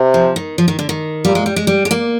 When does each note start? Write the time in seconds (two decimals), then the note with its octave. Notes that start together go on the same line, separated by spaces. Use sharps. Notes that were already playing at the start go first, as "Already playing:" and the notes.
Already playing: C3
0.14 F3
0.36 D#3
0.58 F3
0.68 D#3
0.79 D3
0.89 D#3
1.24 A#2 G3
1.35 G#3
1.46 G3
1.56 G#3
1.67 G3
1.85 G#3
1.91 A#3